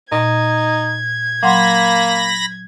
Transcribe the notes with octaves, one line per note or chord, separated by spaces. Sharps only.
A#2 D#4 G#6
F#3 A#3 F#5 B5 C6 A#6